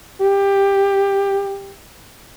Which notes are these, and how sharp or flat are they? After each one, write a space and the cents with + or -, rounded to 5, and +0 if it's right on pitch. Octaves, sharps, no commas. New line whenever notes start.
G4 +15